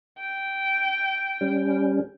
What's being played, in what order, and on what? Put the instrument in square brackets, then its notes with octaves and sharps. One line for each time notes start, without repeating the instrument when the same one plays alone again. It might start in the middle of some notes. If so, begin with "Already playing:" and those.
[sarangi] G5
[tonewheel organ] G3 C#4